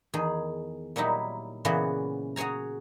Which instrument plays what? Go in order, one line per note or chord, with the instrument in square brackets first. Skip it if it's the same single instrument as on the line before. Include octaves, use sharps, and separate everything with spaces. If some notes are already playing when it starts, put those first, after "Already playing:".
[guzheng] E2 D#3 G#4
A#2 F#3 G3 D#4 E4
A#2 C#3 E3 B3 F#4
F#4 G#4 C#5 G#5 A#5